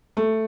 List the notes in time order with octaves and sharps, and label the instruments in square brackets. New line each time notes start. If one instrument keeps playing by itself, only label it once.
[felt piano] A3